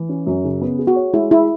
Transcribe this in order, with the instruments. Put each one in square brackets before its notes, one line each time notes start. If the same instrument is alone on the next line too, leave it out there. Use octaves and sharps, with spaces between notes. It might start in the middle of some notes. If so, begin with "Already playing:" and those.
Already playing: [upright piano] E3
C#4
F#2
C#3
B3
G#4
[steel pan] F#4
[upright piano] C#5
[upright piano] G#3 [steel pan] E4
[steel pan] E4 [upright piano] G#4